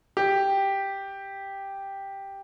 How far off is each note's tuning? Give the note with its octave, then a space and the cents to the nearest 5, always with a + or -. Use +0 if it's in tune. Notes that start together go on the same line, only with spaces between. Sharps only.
G4 +0